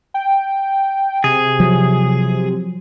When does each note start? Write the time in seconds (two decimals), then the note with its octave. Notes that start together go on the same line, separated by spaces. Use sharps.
0.14 G5
1.24 C3 G#4
1.60 F3 F#3